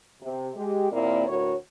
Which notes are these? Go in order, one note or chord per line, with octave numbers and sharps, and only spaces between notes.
C3
G#3 G4
D#2 A#2 A#3 C4 E4 D5
D2 A2 D3 F#4 A#4 C#5